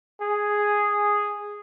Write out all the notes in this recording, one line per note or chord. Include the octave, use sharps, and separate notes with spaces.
G#4